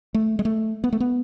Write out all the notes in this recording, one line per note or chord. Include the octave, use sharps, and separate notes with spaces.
A3
G#3
A3
B3
A3
B3